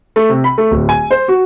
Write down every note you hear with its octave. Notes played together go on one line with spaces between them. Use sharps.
A3
C3
B5
A3
D1
G#5
C5
F#4